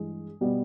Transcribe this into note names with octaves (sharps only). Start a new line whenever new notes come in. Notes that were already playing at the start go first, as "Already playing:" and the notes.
Already playing: G2 E3 G#3 G#4
B2 G3 B3